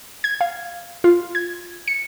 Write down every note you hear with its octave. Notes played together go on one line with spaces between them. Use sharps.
G#6
F5
F4
G#6
C#7